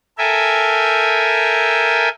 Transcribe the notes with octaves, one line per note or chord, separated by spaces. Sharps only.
A4 A#4 E5 G5 G#5